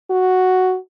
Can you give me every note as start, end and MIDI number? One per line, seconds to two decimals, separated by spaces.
0.10 0.77 66